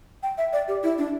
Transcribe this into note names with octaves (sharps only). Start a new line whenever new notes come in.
G5
E5
D5
G4
E4
D4